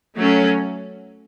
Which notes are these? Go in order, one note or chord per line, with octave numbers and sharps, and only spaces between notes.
F#3 A3 C#4